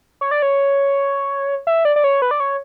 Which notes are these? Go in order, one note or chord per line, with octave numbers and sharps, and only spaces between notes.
C#5
D5
C#5
E5
D5
D5
C#5
B4
D5
C#5